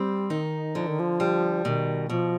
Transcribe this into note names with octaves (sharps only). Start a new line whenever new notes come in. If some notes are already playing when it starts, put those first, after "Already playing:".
Already playing: G3 C4
D#3 D#4
D3 F3
D#3
F3
G3
B2 D#3
B2 F3